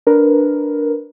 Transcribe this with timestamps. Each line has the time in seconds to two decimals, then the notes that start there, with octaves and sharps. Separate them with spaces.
0.07 D4 A#4 B4